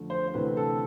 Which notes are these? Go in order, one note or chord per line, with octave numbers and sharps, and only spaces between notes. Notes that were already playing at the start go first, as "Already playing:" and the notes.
Already playing: F2 D3 A3
C5
C5
D2 C3 E3 A3 C4 B4
A4